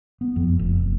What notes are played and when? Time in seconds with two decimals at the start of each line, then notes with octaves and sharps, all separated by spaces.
0.21 B3
0.36 F2
0.59 F1